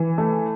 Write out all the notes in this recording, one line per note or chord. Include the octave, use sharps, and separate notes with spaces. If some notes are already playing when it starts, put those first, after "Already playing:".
Already playing: E3
A3